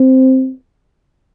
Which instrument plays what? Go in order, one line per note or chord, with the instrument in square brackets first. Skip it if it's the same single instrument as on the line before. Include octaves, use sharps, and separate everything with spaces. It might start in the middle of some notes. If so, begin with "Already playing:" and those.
Already playing: [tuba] C4